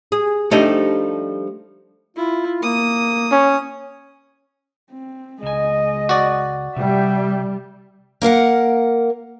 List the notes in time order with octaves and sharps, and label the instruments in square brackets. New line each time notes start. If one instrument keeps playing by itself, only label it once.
[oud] G#4
[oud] F3 G3 D4 [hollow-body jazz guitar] A3 D#4 D#5
[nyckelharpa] E4 [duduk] F4
[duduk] A#3 [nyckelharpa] D#6
[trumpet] C#4
[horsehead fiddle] C4
[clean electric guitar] C#2 G#5 [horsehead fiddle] G#3 D#5
[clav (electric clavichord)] F#4 D5
[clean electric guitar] C3 [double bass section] G3 [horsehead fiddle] E5 G5
[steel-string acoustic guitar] A#3 A#4 F5 F#5